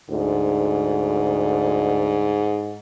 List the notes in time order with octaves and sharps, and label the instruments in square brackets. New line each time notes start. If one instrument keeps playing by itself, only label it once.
[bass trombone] D2 [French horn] G#2